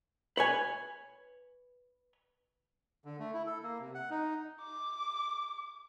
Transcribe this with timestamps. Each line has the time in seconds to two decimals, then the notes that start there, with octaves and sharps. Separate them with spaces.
0.37 B4 C#5 G#5
3.05 D3
3.19 A3
3.34 E4
3.46 A4
3.63 A#3
3.80 C3
3.95 F#5
4.10 D#4
4.62 D6